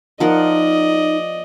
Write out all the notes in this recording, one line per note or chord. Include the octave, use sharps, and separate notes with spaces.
F3 D#4 A#4 D5 D#5 F#5